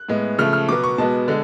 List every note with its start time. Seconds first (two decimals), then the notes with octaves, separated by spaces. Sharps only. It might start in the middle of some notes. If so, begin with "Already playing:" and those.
Already playing: F#6
0.09 A2 G#3 B3
0.38 C#3 F3 A3 F6
0.53 F6
0.69 B2 F#3 B3 D6
0.84 C#6
0.98 B2 G#3 B3 A5
1.28 D3 G#3